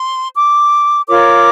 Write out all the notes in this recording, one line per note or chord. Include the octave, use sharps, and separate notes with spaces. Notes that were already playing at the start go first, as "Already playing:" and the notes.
Already playing: C6
D6
F4 A#4 C#5 D6